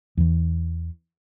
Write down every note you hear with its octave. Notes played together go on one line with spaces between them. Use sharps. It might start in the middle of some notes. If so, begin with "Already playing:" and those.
E2 E3